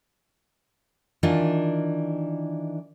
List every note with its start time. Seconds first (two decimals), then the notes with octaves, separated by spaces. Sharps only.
1.23 D#3 E3 D4 F4